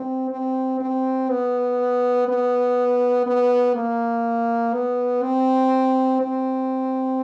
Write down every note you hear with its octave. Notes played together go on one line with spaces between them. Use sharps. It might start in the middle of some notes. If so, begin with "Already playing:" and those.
Already playing: C4
C4
C4
B3
B3
B3
A#3
B3
C4
C4